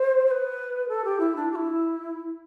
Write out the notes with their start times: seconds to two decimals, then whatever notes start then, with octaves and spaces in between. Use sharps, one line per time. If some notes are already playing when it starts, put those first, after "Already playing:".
Already playing: C5
0.25 C5
0.30 B4
0.88 A4
1.04 G4
1.19 E4
1.35 D4
1.51 G4
1.55 E4